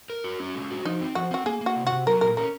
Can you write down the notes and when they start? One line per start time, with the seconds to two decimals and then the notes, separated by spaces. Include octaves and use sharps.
0.10 A#4
0.24 F#4
0.40 C#4
0.55 G#3
0.70 F#4
0.85 F3 D#4
1.01 C4
1.15 F3 F#4
1.31 C4 F#4
1.46 A#3 G#4
1.61 A#3
1.66 F#4
1.76 C3
1.87 F#4
1.92 C3
2.07 F#3 A#4
2.21 A#2 A#4
2.37 C#4 A#4